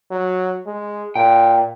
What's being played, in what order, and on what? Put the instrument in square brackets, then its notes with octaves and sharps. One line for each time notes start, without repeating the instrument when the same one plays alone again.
[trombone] F#3
G#3
[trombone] A#2 [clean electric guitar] G5